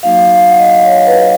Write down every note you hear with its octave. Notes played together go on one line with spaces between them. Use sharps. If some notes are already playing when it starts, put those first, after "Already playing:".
F#3 A#3 D#4 F#4 F5
F5
F#5
D#5
F5
C#5
B4